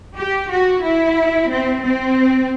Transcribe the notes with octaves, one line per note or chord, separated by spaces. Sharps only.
G4
F#4
E4
C4
C4